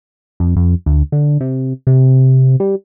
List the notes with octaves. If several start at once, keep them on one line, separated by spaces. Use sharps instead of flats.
F2
F2
D2
D3
C3
C3
G3